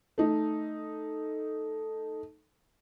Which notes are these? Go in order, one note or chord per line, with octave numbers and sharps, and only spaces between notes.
A3 D#4